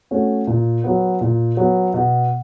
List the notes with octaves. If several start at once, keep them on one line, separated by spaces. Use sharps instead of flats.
A3 C#4 F#4
A#2
F#3 B3
A#2
F#3 B3
B2